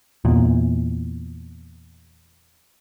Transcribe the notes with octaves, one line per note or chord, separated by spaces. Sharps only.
E2 A#2